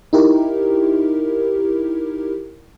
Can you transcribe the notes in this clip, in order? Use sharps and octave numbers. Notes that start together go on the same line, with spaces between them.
D#4 E4 G4 A#4